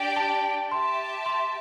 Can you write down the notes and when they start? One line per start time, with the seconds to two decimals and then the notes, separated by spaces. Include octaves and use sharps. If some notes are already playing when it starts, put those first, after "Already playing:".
Already playing: D4 G4 D5 G5
0.16 A5
0.71 G4 E5 A5 C6
1.26 C6